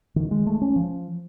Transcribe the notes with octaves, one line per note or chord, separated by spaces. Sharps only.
D#3
G#3
A3
C#4
F3